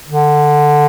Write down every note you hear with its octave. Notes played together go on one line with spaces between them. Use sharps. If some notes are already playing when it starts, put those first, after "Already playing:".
D3